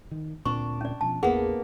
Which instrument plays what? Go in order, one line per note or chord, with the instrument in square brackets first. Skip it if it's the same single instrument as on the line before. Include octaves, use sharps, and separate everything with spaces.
[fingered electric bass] D#3
[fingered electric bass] D2 A#2 C4 [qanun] D4 [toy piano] C#6
[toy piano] C#4 D5
[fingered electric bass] B2 F3 [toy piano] A5
[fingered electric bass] A1 E2 [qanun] A#3 B3 [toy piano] G#4 F#5